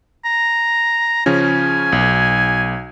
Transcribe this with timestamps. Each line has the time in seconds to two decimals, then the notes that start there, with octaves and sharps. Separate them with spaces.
0.25 A#5
1.26 C#3 F3 C#4 G#5
1.92 B1